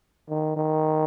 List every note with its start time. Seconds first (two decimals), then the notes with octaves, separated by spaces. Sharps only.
0.29 D#3
0.57 D#3